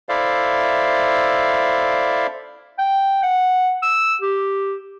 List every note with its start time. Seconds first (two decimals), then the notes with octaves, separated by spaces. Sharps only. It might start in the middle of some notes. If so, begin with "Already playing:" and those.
0.09 E4 A4 C5 D5 E5 F5
2.78 G5
3.23 F#5
3.82 E6
4.21 G4